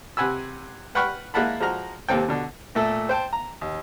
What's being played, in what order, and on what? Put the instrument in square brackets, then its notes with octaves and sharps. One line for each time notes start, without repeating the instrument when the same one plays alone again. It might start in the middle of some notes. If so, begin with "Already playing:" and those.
[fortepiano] C3 F#5 G#5 B5 E6
B4 F#5 G5 B5 C#6 F6
G#3 A#3 E4 F#5 A5 B5
F3 G#3 F#4 A#5 F6
D#2 C3 A#3 C4 A4 G5
B2 D3
A#2 A3 A4 E6
C5 G5 A5
A#5
D#2